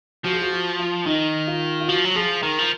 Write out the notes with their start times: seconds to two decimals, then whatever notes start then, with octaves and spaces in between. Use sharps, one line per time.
0.25 F3 F#4
0.33 G#4
0.41 F#4
0.52 F#4
0.79 F4
1.06 D#3 D#4
1.47 F4
1.80 F4
1.88 F3 F#4
2.05 F#3
2.16 F3 G#4
2.43 D#3 A#4
2.58 F3